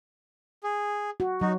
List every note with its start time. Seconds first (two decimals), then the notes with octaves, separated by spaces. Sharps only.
0.63 G#4
1.20 F#4
1.41 F#3 D#4 F#4